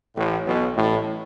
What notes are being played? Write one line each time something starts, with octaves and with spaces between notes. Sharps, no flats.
A1 A2
B1 B2
A1 A2